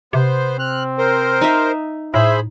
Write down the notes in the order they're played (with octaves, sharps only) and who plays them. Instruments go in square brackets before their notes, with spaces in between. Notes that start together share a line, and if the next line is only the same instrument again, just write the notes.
[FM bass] C3 [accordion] B3 C5
[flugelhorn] C4 [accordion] F6 F#6
[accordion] A#4 C5
[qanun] D#4 E5
[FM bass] A2 [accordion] G#4 C5 B5 [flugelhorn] E5